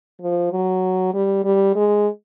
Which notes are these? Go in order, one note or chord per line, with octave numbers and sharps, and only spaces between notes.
F3
F#3
G3
G3
G#3